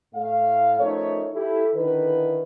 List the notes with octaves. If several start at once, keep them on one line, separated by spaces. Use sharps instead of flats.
A2 A3 F5
F3 A3 C#4 D#4 A#4 C#5
E4 G4 A4
D3 D#3 E4 B4